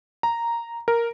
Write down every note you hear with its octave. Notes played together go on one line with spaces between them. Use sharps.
A#5
A#4